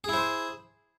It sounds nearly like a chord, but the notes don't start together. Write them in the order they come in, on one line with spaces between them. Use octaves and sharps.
G#4 E4 C5